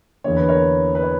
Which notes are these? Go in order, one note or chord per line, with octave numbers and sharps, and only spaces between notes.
E2 D3 A#3 C#5
B4
A#4 C#5
B4
C#5